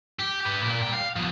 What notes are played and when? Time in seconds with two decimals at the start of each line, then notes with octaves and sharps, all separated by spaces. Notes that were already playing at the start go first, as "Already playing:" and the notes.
0.19 G4
0.41 G4 B4
0.61 A#2 A#4
0.82 G3 G5
0.94 F5
1.16 F3 B3